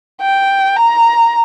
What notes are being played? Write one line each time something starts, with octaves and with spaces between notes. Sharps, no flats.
G5
A#5